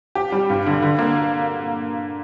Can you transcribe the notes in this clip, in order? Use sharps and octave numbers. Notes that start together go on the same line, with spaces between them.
G4
G3
G2
D3
D3
A#3